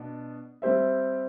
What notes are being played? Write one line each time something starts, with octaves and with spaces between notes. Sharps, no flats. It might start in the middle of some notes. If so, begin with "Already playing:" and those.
Already playing: B2 B3 D4
G3 C4 G4 C5 E5